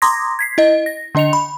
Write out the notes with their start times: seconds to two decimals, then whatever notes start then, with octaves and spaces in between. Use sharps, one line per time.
0.02 A#5 C6 D6 D#6 G#6 A#6
0.39 G#6 B6 C7
0.58 E4 D#5
0.86 A#6
1.15 D3 D4 D#5 C#7 F7
1.33 B5